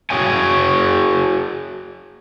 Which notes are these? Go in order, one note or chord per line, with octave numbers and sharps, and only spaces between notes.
F#4 G#4 C#5 G5 G#5